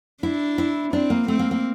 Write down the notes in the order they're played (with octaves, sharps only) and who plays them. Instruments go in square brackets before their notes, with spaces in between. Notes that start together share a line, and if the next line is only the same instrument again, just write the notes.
[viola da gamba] D4 [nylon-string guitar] E4
[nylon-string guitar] E4
[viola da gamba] C4 [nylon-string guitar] D4
[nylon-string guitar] A#3
[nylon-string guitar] A3 [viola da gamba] C4
[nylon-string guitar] A#3
A#3